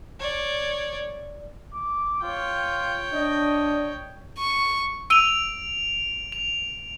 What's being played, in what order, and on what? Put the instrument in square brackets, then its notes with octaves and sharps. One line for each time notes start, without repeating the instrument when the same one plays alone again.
[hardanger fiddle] C#5 D5
[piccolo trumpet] D6
[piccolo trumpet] F4 [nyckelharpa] C#5 G5
[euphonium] D4 [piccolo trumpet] D#5
[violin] C#6
[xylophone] E6 D#7 G7 [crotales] D7 F7
[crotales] F7